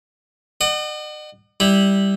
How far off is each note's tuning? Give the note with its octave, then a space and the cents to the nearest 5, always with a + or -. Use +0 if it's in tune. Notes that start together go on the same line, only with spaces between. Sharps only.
D#5 -45 F#5 +25
G3 +0 E4 -10